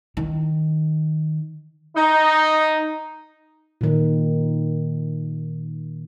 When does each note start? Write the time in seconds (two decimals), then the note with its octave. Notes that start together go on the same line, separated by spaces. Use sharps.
0.17 D#3
1.96 D#4
3.81 A#2 D#3